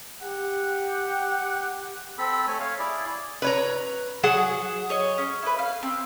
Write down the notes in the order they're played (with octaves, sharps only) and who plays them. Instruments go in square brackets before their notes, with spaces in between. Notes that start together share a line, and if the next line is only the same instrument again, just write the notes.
[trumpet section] G4 F#5
[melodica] C4 A4 B5
A3 C#5 G#5
C#5 F5
E4 G#4 D5
[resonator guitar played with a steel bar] B4 C#5 A#5
F#3 G#4 F#5
[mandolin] G#4 C#5 D#5
C#4
E4 B4
F5
C4